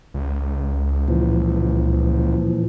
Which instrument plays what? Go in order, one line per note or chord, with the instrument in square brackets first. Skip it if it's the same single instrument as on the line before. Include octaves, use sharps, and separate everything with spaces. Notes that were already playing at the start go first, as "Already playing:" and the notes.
[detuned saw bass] C#2
[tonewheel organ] A#2 E3 F3